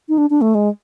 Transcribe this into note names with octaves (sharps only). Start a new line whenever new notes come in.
D#4
D4
D4
A3
G#3